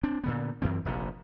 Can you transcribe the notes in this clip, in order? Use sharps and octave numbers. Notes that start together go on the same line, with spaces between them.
C4 D4
A#2 D3 B3
F#2 E3 C4
F1 A#1 C3